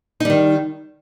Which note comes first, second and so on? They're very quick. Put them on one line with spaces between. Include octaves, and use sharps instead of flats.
D#4 G3 D#3